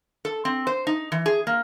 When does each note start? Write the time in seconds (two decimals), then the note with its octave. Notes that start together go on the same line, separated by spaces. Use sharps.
0.25 A4
0.45 C4
0.67 C5
0.87 D#4
1.12 E3
1.26 G#4
1.47 A#3